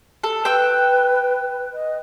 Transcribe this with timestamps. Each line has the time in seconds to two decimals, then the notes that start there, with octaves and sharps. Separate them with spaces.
0.24 A4
0.45 B4 G5 E6
1.74 D#5